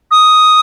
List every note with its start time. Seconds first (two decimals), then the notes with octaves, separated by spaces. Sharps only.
0.11 D#6